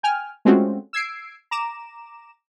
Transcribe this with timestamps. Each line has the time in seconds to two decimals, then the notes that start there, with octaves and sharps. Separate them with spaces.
0.03 G5 G#5 F6
0.45 G#3 A3 C4 C#4 F4 F#4
0.93 E6 G#6 C7 D7
1.51 A#5 D6 E7